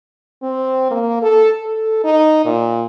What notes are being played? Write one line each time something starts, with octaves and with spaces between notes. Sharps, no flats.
C4
A#3
A4
A4
D#4
A#2